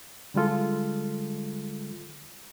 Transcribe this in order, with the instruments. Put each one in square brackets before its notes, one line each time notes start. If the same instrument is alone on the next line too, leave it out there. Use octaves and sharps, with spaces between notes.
[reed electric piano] D3 G3 G#3 F4 A4